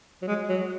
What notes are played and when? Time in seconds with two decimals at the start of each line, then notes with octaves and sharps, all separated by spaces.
0.22 F#3
0.27 G#3
0.49 F#3